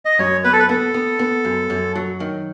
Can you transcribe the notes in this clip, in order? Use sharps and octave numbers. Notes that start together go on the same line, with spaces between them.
D#5
F#2 C#5
B3 B4
A4
B4
B3 A4
B3
B3
F#2
F#2
F#3
D#3